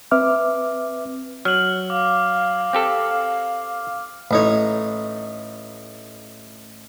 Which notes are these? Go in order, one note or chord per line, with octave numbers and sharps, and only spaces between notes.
C4 B4 E5 D6 F6
F#3 F6 F#7
F5 D6
C4 G4 A4
A1 D#4 C#5